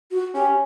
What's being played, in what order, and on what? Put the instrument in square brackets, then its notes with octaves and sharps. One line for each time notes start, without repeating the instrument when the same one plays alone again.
[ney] F#4
[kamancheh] C#4 [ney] G4